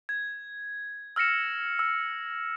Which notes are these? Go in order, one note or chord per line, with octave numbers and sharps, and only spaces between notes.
G#6
E6 F6 A#6 C#7 E7
E6